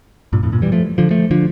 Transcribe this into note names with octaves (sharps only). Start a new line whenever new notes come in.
G2 A#2
F2 A2
G2 A#2
E3 G3
F3 A3
D3 F3
F3 A3
D3 F3